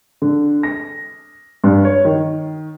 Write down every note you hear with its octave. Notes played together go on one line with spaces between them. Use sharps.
D3
A#6
G2
C#5
D#3